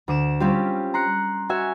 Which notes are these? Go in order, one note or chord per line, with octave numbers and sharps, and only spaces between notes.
D2 D6 E7
G3 C4 C#4 F4 G4
A#5 C6 F#6 C#7
F#4 C#5 E5 G#5